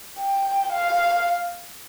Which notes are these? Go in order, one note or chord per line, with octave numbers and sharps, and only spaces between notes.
G5
F5